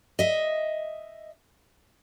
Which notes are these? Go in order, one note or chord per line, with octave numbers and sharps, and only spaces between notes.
D#5 E5